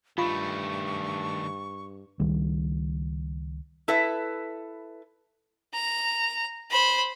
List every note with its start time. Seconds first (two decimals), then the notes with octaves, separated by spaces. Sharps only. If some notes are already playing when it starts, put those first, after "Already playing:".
0.18 G2 D#3 A3 F4 B5 C#6
2.20 C#2 D#3 G3
3.88 E4 A4 B4 E5
5.74 A#5
6.71 C5 B5